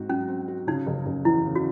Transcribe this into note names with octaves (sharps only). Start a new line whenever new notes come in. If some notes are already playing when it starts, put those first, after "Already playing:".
Already playing: G#2 C4 F#4
F#3 C#4
C4
F#4
C#3 D#4
F#1
F#1
E2 E4
C#3
F#4